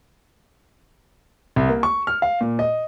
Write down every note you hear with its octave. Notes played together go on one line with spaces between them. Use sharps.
C2
A#3
C#6
F6
F5
A#2
D#5